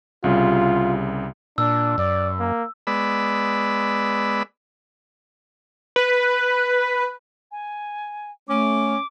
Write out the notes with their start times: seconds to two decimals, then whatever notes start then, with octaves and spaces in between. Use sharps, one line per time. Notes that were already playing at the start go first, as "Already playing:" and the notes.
0.24 C2 C#3 G3 F4
1.58 A#2 D4 E6
1.98 F#2 D5
2.39 A#3
2.87 G#3 B3 D5 B5 E6
5.96 B4
7.51 G#5
8.48 A3 C#4 D6